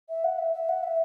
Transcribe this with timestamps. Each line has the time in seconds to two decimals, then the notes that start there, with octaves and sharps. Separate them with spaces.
0.09 E5
0.24 F#5
0.38 E5
0.53 E5
0.68 F#5
0.83 E5